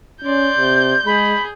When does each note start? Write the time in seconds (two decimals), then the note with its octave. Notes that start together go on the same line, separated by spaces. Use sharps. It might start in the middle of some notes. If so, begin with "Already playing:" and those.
0.24 C#4 D5 C6 G6
0.58 C3
1.06 G#3 G#4 B5